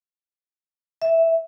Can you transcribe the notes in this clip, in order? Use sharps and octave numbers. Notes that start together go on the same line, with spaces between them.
E5